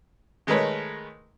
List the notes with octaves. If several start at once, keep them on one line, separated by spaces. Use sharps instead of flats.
D#3 G#3 A3 A#4 B4 C#5